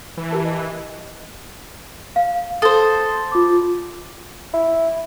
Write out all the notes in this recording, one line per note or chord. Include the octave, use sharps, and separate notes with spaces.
E3
G4 A#4 A5
D#5
F5
A4 C5 D#6
F4 D6
E4